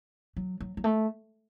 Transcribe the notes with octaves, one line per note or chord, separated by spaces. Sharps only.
F#3
F#3
F#3
A3